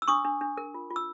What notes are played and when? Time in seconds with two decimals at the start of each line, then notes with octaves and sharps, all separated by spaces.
0.02 E6
0.08 D4 C#6 D#6
0.25 D4
0.41 D4
0.57 A#4
0.74 F4
0.90 F4
0.96 E6